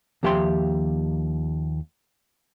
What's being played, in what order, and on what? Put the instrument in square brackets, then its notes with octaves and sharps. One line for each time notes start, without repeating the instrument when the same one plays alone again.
[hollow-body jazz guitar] D#2 F3 G4 E5 G5 C6